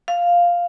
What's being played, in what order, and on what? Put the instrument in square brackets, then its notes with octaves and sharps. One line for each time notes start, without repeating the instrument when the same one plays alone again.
[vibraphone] F5